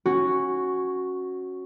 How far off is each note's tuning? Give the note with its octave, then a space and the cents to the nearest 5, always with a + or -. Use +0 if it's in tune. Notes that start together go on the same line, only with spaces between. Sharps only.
C#4 -15 F#4 +0